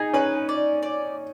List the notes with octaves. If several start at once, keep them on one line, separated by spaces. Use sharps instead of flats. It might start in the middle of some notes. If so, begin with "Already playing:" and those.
Already playing: D#4 G#4
C#4 B4
D5
D5